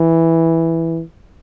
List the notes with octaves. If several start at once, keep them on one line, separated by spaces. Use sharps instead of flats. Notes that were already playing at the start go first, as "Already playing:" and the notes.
Already playing: E3